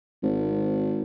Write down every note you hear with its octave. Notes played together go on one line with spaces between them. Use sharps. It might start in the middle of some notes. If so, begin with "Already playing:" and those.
G#1